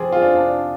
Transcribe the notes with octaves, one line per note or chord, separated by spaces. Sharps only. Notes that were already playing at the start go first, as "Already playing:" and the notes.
Already playing: F3 C4 G4 G#4
F4
D4
D4